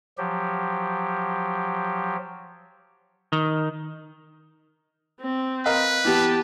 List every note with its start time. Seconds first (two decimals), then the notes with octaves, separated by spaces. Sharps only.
0.18 F3 F#3 G4
3.32 D#3
5.21 C4
5.66 A#4 B4 D#5 F5
6.05 E3 B3 G4 A5